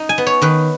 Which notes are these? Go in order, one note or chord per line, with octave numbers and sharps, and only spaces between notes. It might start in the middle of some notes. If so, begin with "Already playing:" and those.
Already playing: D#4
G#5
B3
C#5
D#3 B4